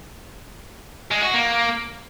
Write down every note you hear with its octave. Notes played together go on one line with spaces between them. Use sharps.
G#3
F#4
A#3